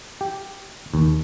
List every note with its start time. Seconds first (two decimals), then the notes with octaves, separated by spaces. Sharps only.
0.21 G4
0.94 D#2